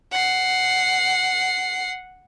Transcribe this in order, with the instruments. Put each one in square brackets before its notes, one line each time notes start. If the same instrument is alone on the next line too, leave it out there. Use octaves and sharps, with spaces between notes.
[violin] F#5 C7